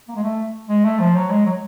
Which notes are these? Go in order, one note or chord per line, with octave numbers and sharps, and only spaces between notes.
A#3
G#3
A3
G#3
A3
F3
F#3
G#3
F#3